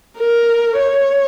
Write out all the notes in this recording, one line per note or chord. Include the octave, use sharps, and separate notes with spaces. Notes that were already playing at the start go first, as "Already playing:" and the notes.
A#4
C#5